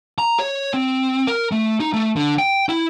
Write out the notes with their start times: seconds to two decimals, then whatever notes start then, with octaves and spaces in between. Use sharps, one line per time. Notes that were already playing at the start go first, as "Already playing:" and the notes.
0.18 A#5
0.39 C#5
0.74 C4
1.27 A#4
1.52 A3
1.80 D#4
1.93 A3
2.16 D3
2.39 G5
2.69 E4